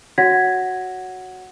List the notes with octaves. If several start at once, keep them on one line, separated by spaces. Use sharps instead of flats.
F#4 C#5 F#5 G#6 A#6 B6